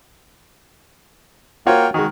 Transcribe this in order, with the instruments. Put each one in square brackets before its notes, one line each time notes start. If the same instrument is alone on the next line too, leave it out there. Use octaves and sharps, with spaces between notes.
[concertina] A#3 A#4 G5 [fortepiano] F4 F#4 C#5
[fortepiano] D#3 G#3 [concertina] F#4